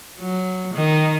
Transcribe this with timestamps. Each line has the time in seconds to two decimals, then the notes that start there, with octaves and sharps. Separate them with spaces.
0.19 F#3
0.74 D#3